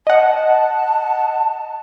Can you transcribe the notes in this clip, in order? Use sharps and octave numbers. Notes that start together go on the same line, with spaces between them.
D#5 F#5 A5